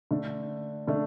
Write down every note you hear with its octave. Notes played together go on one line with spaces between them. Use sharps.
D3 A3 D4
D3 A3 D4